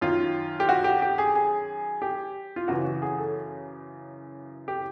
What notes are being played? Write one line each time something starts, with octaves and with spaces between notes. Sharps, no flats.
F#2 D#3 F4
G4
F#4
G4
G4
G#4
G#4
G4
F4
F#2 C#3 E3 F#4
F#4
G#4
A4
G4